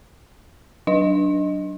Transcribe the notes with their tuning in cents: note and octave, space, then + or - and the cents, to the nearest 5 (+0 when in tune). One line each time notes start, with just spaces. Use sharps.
F#3 +15 D4 +0 D#5 +0